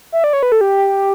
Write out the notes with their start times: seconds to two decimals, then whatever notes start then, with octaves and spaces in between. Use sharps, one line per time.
0.12 E5
0.24 D5
0.33 C#5
0.43 B4
0.52 A4
0.61 G4